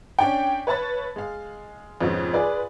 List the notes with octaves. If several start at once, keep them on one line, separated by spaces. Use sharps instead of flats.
C#4 D4 G5
B4 C#5 E5 A5 B5 A6
G#3 F5
F2 G#2 B2 G#3 C4 C#4
F4 G#4 B4 D5